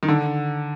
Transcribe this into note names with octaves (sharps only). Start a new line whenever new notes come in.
D#3
D3